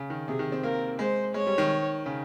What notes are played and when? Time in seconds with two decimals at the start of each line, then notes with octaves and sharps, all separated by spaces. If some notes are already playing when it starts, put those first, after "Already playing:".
Already playing: C#3
0.10 D#3
0.27 C3 G#4
0.39 D#3
0.52 C4
0.63 A#3 A#4
0.99 G#3 C5
1.34 G#3 C#5
1.47 G3
1.58 D#3
2.06 C#3